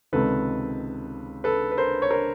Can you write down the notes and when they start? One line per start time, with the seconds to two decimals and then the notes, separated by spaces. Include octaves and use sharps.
0.13 C#2 C3 D#3 A4 B4
1.44 A4 B4
1.72 B4
1.77 A#4 C5
2.02 C#5
2.10 A#4 C5